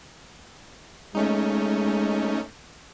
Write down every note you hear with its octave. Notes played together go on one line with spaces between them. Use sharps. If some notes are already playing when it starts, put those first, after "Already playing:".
G#3 A3 C#4 D#4